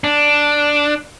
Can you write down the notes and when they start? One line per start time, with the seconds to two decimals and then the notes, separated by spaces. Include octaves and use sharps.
0.04 D4